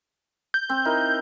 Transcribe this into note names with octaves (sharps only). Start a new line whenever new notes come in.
G6
C4
D#4 E4 A#4